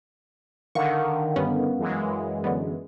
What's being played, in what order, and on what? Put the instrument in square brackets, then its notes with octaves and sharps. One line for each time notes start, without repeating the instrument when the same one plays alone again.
[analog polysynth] D3 D#3 [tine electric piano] A#4 F5 F#5 [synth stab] C#6
[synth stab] G2 B3 C#4
[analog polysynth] F#2 E3 G#3
[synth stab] D3 F#3 B3